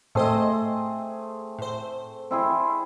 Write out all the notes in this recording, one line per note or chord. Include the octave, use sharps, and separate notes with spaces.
A2 A3 C4 G#4 C5 D#5
A2 C5
C4 E4 G#4